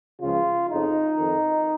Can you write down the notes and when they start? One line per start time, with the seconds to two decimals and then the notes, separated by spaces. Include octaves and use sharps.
0.22 C#2 C#3 F3 F4
0.70 F2 C#3 F3 D#4
1.18 F2 D#3